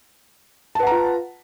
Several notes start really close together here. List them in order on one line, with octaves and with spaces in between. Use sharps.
A5 B4 F#5 A#5 F4